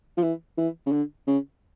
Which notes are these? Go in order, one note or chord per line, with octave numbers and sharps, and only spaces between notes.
F3
E3
E3
C#3
D3
C#3